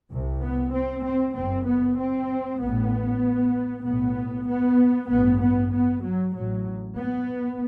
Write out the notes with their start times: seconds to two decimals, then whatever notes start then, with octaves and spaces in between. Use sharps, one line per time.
0.11 C2 C3
0.42 B3
0.74 C4
1.05 C4
1.36 F#1 F#2 C4
1.67 B3
1.98 C4
2.61 A1 A2 B3
3.85 B1 A2 B3
4.48 B3
5.10 A1 G2 B3
5.41 B3
5.73 B3
6.04 F#3
6.34 A1 A2 F#3
6.97 B3